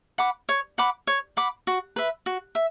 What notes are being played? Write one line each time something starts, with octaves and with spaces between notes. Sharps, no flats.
F#5 B5 D6
C#5
F#5 B5 D6
C#5
F#5 B5 D6
F#4
B4 E5
F#4
E5